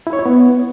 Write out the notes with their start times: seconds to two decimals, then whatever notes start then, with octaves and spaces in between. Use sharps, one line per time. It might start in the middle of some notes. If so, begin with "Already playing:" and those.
0.07 E4
0.13 C#5
0.19 E4
0.26 B3